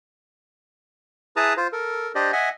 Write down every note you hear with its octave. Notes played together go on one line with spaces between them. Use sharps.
E4 G#4 B4 A5 A#5 D#6
F4 C5
A4 A#4
D4 G4 C5 D5 D#5
D#5 E5 F#5 G#5